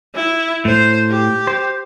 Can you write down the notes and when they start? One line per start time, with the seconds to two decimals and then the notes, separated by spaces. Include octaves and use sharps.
0.15 E4
0.65 A2 C5
1.09 G4
1.47 C5